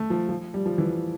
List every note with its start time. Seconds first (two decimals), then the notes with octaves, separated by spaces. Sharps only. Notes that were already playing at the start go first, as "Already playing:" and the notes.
Already playing: A3
0.10 F3
0.29 F3
0.54 G3
0.66 F3
0.78 E3